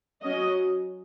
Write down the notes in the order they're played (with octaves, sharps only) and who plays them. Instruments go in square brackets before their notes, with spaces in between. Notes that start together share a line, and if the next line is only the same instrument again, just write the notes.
[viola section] F#3 C#4 D#5